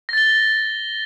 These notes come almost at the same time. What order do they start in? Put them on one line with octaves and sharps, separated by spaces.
A#6 A6 G7